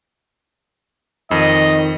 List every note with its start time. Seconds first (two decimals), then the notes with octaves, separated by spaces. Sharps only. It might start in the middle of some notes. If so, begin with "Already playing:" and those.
1.31 F2 D#3 D#5